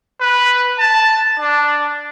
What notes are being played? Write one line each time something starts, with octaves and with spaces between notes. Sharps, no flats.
B4
A5
D4